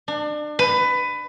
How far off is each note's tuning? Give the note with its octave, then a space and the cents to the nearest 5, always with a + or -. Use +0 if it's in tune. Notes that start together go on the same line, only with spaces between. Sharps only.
D4 +30
B4 +20